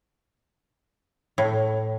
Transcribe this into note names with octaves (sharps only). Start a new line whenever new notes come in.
A2